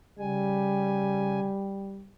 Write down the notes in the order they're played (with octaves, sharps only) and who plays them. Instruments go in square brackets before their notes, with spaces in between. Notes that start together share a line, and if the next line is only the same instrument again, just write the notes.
[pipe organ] C#3 G#5 [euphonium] G3